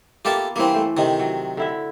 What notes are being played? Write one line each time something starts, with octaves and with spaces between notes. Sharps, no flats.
A#3 B3 F4 G4 A4 E5
G2 E3 A#3 C4 B4
A3 C5
C3 D#3
F#3
D3 E4 E5